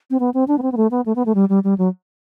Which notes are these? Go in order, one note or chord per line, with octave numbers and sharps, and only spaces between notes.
C4
B3
C4
D4
B3
C4
B3
A3
B3
A3
B3
A3
G3
G3
G3
F#3